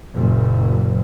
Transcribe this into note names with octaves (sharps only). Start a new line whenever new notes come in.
F#1 A#2